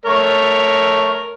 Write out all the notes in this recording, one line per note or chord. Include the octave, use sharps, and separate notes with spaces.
A3 A#4 C#5